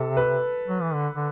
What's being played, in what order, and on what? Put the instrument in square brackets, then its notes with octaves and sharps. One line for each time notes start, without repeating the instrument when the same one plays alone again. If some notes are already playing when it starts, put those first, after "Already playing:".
Already playing: [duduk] C3 [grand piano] A4
[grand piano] B4
[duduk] F#3
E3
D3
D3